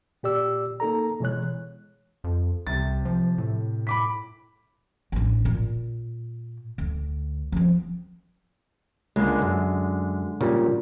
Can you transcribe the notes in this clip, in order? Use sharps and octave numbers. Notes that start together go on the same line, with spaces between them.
A#2 G4 D5 E6
A#3 D#4 A4 A#5
B2 E3 G#3 C#5 F#6
F2
C2 C3 A6
F3
A2
B5 D6 B6
A1 D4
A#2
D2
F3 C4
C#2 D3 G#3 A#3
F#2
A#2 C#3 G3